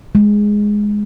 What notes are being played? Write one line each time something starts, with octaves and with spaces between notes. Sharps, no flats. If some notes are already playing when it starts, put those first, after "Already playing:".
G#3